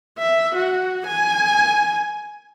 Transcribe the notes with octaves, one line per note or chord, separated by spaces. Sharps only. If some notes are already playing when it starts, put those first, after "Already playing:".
E5
F#4
G#5